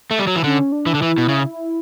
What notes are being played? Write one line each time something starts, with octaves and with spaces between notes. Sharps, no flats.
A3
G3
F#3
E3
D3 C#4
D4
E3
D3
E3 E4
B2
C#3